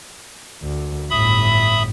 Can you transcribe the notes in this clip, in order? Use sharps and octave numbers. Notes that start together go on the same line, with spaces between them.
D2
G1 A2 E5 B5 D#6